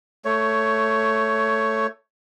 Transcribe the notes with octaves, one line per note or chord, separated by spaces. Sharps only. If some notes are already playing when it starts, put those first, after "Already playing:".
A3 C#5